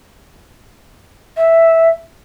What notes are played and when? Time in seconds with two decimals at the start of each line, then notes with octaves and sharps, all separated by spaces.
1.37 E5